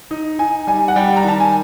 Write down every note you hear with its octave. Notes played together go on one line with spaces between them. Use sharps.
D#4
D#4 G#5
G3 G#5
F#5
G3 G5
A#5
D#3 A5
G#5